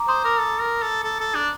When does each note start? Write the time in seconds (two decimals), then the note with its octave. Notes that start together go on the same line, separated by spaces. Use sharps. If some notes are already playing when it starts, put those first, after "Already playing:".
Already playing: A#5 D6
0.08 C5 C6 D#6
0.24 A#4 A#5 D6
0.40 A4
0.61 A#4
0.82 A4
1.04 A4
1.20 A4
1.36 D4